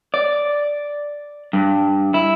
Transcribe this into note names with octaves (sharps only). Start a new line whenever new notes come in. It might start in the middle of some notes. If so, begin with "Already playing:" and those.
D5
G2
E4